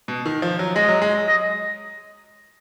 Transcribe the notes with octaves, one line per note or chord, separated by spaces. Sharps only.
B2
D#3
F3
F#3
G#3 D#5
F#3
G#3
D#5